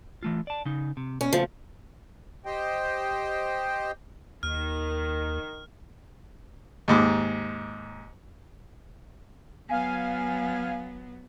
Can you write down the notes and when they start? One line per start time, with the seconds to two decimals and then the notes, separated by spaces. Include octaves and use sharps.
0.23 E3 A3 F4
0.47 D5 A5
0.65 C#3 D#4
0.97 C3
1.21 B2 C#4
1.33 C#3 F3 A3 B3
2.44 G4 C5 D#5 G5
4.43 D#2 D#3 F6
6.88 D#2 G#2 D6
9.69 F#3 B3 F5 G#5